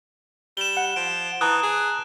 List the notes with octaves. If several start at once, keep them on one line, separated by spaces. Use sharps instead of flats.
G3 E7 G7
F#5
F3 D7
E3 A5 A#5 D#6 F#6 G7
G#4